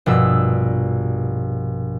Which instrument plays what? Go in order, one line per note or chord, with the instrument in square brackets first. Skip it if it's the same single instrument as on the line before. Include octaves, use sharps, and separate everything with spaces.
[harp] A#1 G2 B2 E6